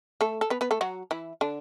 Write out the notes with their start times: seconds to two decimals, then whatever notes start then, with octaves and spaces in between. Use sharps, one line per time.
0.21 A3 A4
0.41 A4
0.50 B3 B4
0.61 B3 B4
0.71 A3 A4
0.81 F#3 F#4
1.11 E3 E4
1.41 D3 D4